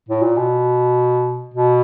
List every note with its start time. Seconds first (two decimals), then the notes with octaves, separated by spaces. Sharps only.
0.09 A2
0.23 A#2
0.37 B2
1.54 B2